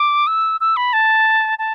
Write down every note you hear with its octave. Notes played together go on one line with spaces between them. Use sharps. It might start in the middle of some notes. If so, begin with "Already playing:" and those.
Already playing: D6
E6
E6
B5
A5
A5